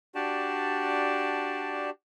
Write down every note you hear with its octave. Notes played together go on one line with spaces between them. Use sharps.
D4 F#4 G4 D5 A5